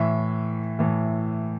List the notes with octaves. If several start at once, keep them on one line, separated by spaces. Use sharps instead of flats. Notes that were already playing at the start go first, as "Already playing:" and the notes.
Already playing: A2 E3 E5
A2 E3